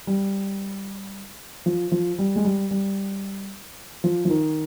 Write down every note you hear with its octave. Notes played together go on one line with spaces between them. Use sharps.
G3
F3
F3
G3
G#3
G3
G3
F3
F3
D#3